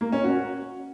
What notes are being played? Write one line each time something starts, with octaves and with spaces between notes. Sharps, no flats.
A#3
C#4
F#4